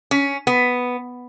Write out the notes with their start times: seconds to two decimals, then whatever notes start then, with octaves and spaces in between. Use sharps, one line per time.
0.11 C#4
0.47 B3